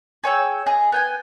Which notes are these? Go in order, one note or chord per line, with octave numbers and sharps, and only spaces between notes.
G#4 C#5 G5 E6
G#4 D#5
B3 G5 G#5